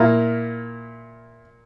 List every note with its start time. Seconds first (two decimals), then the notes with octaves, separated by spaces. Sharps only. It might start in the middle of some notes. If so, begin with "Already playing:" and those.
Already playing: A#2 A#3 E4